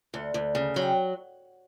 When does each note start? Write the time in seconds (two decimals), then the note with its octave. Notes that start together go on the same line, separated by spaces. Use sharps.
0.13 D2 F#5
0.34 D2
0.55 C#3
0.74 F#3 G#5
0.82 G5